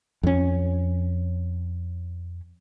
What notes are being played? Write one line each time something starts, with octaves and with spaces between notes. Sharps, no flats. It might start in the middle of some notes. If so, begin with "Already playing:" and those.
F2 C#4